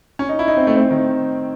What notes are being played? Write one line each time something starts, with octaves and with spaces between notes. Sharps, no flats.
C#4
D#4
E4
D#4
C4
A3
C4
D#3